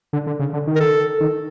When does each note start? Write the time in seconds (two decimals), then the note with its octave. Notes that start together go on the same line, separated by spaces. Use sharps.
0.13 D3
0.27 D3
0.39 C#3
0.53 D3
0.67 D#3
0.75 A#4
0.80 A4
1.20 D#3